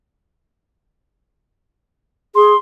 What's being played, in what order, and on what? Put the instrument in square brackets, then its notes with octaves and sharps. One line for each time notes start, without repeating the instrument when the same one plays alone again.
[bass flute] G#4 [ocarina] C6